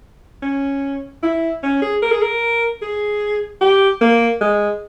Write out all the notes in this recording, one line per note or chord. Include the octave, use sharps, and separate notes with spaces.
C#4
E4
C#4
G#4
A#4
G#4
A#4
G#4
G4
A#3
G#3